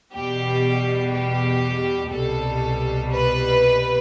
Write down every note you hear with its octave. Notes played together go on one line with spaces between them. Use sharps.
E2 B2 G3 G4
G4
C2 B2 G3 A4
B4